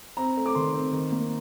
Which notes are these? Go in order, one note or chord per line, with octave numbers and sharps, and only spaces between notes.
C4 A#5
A3
D6
D#3 C6
C4
D#3
A#3